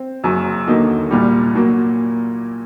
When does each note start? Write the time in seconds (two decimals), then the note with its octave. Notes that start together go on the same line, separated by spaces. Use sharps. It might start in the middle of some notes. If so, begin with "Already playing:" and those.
Already playing: C4
0.24 F#1 F#2 F#3
0.67 D#2 D3 F#3 A#3 D#4
1.11 C2 A#2 G3
1.55 A#2 F#3 A#3